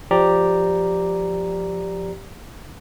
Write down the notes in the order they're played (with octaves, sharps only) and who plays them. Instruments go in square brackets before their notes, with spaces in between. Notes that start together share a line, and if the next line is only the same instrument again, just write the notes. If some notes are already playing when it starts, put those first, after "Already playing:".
[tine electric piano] F3 G4 D5 A#5